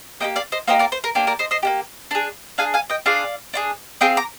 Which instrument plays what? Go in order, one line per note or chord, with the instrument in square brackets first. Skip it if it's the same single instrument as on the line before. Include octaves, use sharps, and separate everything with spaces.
[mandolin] A#3 D#4 G4 D#5 G5
D5 F5
C5 D#5
A#3 D#4 G4 C5 D#5
A#4 D5
C5
A#4
A#3 D4 G4 C5
A#4 D5
C5 D#5
C5 D#5
A#3 D4 G4
D4 G#4
D4 G#4 F5 G#5
F5 G#5
D#5 G5
D4 F4 G#4 D5 F5
D4 F4 G#4
C4 F4 G#4 D#5 G5
A#5 D6